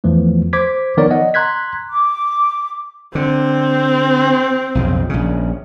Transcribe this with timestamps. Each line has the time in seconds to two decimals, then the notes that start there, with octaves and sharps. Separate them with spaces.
0.04 E2 E3 F3 A3
0.53 C5 D6 G#6 B6
0.97 D#3 F3 B3 A#4 C#5 D5
1.11 D#5 F#5
1.34 A#5 C6 F#6 G#6 B6
1.90 D6
3.15 D3 C4
4.75 B1 F2 C#3
5.09 A#1 C#3